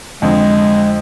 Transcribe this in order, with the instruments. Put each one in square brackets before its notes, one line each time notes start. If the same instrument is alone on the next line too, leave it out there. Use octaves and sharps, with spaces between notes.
[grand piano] F2 D3 [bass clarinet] G#3